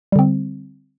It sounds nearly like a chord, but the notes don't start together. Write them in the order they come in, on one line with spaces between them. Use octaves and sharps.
G3 D3 C4